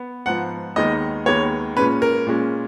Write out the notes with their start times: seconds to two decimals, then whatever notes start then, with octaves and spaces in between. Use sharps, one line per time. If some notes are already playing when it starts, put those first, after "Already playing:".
Already playing: B3
0.26 G#2 F3 B3 F#5
0.76 D#2 D#3 G#3 B3 D#5
1.26 D#2 D#3 G#3 B3 C#5
1.77 A#2 G#3 C#4 B4
2.02 A#4
2.27 A#2 G#3 C#4